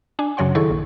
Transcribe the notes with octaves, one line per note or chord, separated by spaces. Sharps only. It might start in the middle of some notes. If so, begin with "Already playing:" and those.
D4 G#5
F#2 C#3 F#3 C#5 F#5 C6
D#3 E4 G#4 A4 C#6
A#1